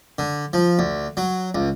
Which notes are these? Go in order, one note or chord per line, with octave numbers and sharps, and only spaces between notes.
D3
F3
D2
F#3
C#2